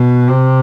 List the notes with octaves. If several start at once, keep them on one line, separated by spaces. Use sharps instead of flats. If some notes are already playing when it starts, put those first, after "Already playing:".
Already playing: B2
C3